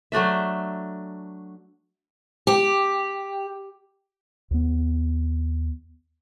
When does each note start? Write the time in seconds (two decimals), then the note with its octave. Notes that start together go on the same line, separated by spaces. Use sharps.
0.12 F#3 A3 D4 E5
2.47 G4
4.51 D#2 B3